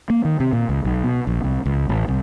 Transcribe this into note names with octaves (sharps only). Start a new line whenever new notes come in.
A#3
D#3
C3
A#2
C#2
B1
B2
A#1
C2
C#2
A1
C2